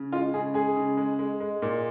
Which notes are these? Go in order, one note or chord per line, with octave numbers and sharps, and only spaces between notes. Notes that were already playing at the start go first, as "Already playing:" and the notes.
Already playing: C#3
G#3 F4
C#3 G#4
G#3 G#4
C#3
G#3
G#3
G#3
A#2